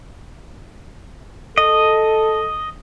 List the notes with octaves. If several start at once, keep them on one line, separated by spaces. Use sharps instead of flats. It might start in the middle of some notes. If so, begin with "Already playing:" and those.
A4 D#5